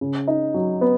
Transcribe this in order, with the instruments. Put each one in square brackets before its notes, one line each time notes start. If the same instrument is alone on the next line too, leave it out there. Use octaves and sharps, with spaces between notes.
[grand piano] C#3
D#4
F#3
B3